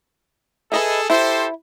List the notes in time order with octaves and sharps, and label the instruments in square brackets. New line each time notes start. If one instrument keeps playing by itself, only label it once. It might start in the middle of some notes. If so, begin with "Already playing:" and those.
[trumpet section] G#4 A4 [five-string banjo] B4 D#5 E5
[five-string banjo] E4 [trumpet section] G4 A4 C5